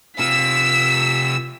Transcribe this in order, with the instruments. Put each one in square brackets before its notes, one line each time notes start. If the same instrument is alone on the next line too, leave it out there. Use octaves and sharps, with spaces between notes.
[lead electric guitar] C3 F4 [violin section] E6 [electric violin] B6